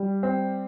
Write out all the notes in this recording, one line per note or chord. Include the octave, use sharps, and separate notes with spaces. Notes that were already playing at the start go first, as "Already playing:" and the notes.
Already playing: G3
C4